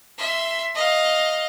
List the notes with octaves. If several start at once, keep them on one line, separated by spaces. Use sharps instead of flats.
E5 C6
D#5 F5